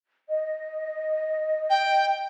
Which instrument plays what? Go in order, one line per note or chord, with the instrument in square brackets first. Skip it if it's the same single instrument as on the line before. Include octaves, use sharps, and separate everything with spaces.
[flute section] D#5
[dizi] G5